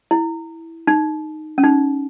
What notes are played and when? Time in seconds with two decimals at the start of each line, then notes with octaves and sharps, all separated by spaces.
0.11 E4
0.87 D#4
1.58 C#4
1.64 D#4